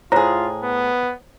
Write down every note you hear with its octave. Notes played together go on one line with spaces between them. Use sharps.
A2 F4 G#4 C5 C#5 A#5
B3